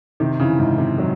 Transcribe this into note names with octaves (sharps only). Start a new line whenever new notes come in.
C3 D#3
C#3 E3
G#2 C3
C3 D#3
D#3 F#3